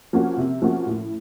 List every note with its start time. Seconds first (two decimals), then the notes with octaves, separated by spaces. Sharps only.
0.13 F3 A#3 C#4 F#4
0.37 C3
0.62 F3 A#3 C#4 F#4
0.87 A2